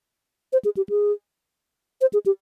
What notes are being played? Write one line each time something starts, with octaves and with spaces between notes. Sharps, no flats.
C5
G#4
G4
G#4
C5
G#4
G4